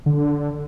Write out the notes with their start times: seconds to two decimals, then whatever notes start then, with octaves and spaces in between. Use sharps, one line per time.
0.06 D3